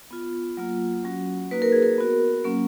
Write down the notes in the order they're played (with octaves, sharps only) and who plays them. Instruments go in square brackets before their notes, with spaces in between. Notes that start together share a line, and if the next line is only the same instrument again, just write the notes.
[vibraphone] B3 F4
F#3 A#3 F4
F#3 C#4 F#4
A#3 D#4 F#4 B4
A#4
G#4
A#4
B3 F#4
F#3 A#3 C#4